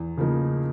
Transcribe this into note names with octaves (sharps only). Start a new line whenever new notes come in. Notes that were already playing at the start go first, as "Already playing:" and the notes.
Already playing: E2
C#3 F3 A#3 D#4